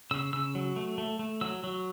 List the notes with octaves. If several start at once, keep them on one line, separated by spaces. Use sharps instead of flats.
C#3 E6
C#3 E6
F#3
A3
A3
A3
F#3 E6
F#3